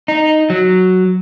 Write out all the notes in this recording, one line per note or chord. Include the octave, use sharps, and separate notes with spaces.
D#4
F#3